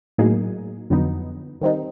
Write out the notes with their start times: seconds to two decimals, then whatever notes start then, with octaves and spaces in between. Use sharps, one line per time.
0.18 A2 F#3 A#3 D#4 G#4
0.90 F2 D3 F#3 B3 D#4
1.61 D#3 G3 C4 D#4